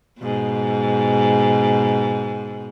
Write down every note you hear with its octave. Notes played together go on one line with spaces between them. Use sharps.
G#2 B2